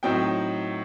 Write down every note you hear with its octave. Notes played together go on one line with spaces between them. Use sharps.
A2 F#3 C4 D#4 G5